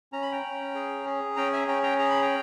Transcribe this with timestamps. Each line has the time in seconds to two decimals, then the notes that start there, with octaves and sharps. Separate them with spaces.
0.13 C#4 A#5
0.22 B5
0.32 G5 A#5
0.43 C#4
0.75 G#4
1.06 G#4
1.36 C#4 G5 A#5
1.53 E5 G#5
1.67 C#4 G5 A#5
1.83 G5 A#5
1.99 G#4 A#5
2.10 B5
2.22 G5 A#5